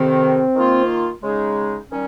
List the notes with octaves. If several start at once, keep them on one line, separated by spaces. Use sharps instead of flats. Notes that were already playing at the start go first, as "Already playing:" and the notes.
Already playing: F2 C3 D#3 C4
D#3 A#3 F4
C#3 G#3 D#4 G#4
D#3 G3 C#4